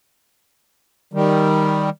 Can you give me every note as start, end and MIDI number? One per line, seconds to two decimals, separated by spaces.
1.13 1.90 51
1.13 1.90 55